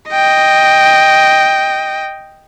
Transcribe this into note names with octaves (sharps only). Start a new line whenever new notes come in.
D#5 G5